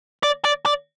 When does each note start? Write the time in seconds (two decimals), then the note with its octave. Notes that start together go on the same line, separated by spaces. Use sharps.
0.23 D5
0.45 D5
0.66 D5